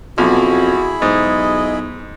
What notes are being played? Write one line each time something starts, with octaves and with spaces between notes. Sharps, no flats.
B1 F2 E4 F#4 G#4 B5
B1 G#2 D#5